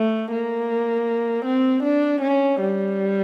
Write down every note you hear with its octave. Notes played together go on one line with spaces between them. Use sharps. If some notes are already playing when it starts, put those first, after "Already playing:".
Already playing: A3
A#3
C4
D4
C#4
G3